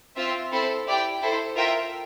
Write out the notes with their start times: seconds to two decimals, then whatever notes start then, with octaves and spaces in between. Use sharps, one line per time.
0.16 C4 F4 C5 E5
0.51 C4 E4 A4 C5
0.86 E4 G4 D5 G5
1.21 E4 A4 C5
1.56 F4 A#4 E5 G5